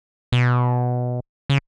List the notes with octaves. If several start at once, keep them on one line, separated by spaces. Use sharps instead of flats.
B2
C#3